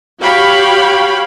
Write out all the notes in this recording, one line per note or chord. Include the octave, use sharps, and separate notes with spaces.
F#4 G4 C#5 F5 G5 B5